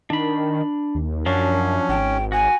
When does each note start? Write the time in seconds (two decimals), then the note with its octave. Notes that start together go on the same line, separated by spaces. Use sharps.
0.10 D#3 D4 B5
0.95 D#2
1.26 F#2 F3 F#3 C#4 D4
1.89 G#1 G5
2.32 F#4 G#5